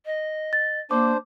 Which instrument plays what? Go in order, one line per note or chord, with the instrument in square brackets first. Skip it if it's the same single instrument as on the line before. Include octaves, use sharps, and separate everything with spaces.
[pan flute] D#5
[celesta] A6
[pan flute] A#3 [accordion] D4 C5 [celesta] D6